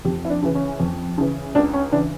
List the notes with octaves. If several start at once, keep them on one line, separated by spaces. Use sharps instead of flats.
F2 G4
E4
D4
C#3 E3
C#4
F2
C#3 E3
C#2 D4
C#4
C#3 E3 D4